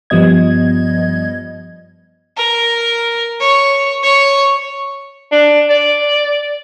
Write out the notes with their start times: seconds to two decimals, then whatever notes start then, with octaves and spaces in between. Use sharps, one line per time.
0.10 G2 F3 G3 B3 D#5 G#6
2.37 A#4
3.40 C#5
4.03 C#5
5.32 D4
5.70 D5